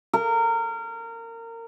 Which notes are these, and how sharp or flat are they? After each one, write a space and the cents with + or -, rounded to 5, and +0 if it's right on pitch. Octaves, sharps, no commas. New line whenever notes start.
A#4 -25